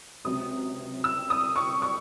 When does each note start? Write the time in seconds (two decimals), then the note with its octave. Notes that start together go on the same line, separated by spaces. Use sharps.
0.24 C#2 C3 F#3 D#6
1.04 E6
1.30 D#6
1.56 C#6
1.82 C#6